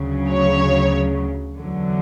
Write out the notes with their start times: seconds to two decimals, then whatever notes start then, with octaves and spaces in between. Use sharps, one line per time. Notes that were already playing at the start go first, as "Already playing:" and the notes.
Already playing: D2 C#3 F#3
0.31 C#5
1.59 E2 D3 F#3